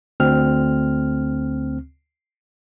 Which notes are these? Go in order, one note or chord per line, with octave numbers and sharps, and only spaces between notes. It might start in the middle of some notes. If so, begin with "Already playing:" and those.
D2 C4 F6